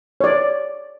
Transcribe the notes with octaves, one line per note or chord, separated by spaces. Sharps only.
C#5 D5